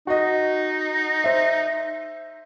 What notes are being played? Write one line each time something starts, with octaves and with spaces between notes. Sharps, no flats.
D#4 F#4 D#5
C5 E5